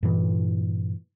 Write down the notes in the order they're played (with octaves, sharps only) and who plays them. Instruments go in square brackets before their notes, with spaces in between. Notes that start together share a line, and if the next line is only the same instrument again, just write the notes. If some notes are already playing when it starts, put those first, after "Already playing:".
[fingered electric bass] G2 A#2 E3